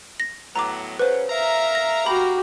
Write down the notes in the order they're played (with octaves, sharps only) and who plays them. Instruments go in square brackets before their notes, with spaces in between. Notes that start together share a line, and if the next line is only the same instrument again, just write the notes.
[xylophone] A#6
[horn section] A2 F#3 B3 [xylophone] A#5 D6
[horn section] C#3 F#3 [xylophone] B4 C5
[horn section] A#4 F5 A#5 [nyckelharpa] E5
[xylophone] A#6
[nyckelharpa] F#4 G4 [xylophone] B5